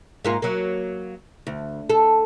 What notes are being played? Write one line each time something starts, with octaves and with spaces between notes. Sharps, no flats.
G#2 A#3 F4
F#3 A#3
D2
A4